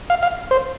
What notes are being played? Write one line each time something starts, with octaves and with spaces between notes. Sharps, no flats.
F5
F5
C5